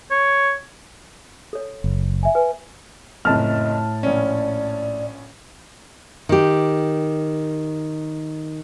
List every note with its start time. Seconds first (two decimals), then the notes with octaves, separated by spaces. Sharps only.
0.11 C#5
1.53 A4 C#5
1.84 F#1
2.23 E5 G#5
2.35 B4 G#5
3.25 F#1 F2 A2 D#5 A5 F6
4.03 A#1 C#4 D5
6.29 D#3 G4